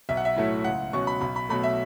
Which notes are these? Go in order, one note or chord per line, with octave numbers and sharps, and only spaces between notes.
B1 E5
F#5
E5
A2 F#3 A3 E4
C#2 F#5
B2 F#3 C#4 C#6
B5
B1 B5
B5
B2 F#3 A3 B5
E5